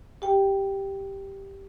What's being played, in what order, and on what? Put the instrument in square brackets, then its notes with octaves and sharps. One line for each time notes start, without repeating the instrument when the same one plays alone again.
[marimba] G4 G5